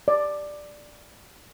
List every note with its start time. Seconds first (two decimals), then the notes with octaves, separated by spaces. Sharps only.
0.08 D5